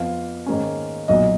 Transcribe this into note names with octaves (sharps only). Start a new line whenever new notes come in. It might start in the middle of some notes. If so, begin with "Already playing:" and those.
Already playing: F2 F3 B3 F5
G#2 D#3 A#3 C#4
B1 A#2 F#3 D#5